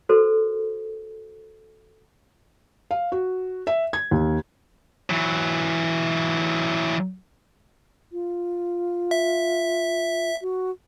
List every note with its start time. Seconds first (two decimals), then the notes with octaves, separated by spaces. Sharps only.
0.09 F#4 A4 A#4 C5
2.91 F5
3.12 F#4
3.67 E5
3.93 G#6
4.11 D#2
5.10 E3 F#3
8.12 F4
9.11 E5
10.42 F#4